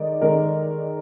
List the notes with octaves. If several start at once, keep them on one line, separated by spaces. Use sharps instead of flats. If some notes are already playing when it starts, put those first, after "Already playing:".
Already playing: D#3 G#3 D#4 A#4 D5
D#3 G#3 D#4 A#4 D5